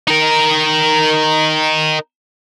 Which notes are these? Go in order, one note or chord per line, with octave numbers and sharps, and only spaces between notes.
D#4 A#4